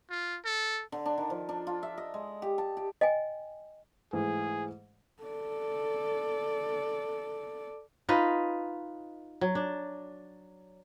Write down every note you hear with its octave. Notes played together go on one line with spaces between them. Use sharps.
F4
A4
D3
D4
D#3
F3
D4
F4
E5
D#5
G#3
G4
A5
G4
D#5 G5 G#5
G#2 E3 A3 G#4
A4 D5
D#4 F4 B4 D#5
F#3
D4